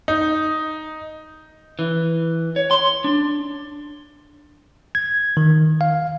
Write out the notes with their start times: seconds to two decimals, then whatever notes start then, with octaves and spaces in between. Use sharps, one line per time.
0.08 D#4
1.79 E3
2.56 C#5
2.71 C6
3.04 D4
4.95 G#6
5.37 D#3
5.81 F5